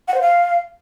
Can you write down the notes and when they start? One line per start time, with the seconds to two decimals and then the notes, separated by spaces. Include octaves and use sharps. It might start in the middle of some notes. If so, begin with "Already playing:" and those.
0.08 F#5
0.14 C5
0.21 F5